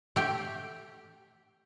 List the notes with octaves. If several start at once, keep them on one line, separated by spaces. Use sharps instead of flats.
A3 G4